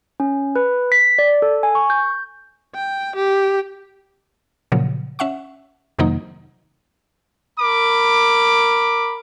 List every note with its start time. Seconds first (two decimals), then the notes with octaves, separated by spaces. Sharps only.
0.20 C#4
0.56 B4
0.92 B6
1.18 D5
1.42 A4
1.63 G#5
1.75 C#6
1.90 G6
2.74 G5
3.16 G4
4.72 A#2 C#3 F3 F#3
5.19 C#4 E5 F#5 C#6
5.99 F2 C3 D#3 F#3 A#3 D#4
7.59 A#4 B5 D6